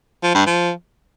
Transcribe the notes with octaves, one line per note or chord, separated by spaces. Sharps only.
F3
G2
F3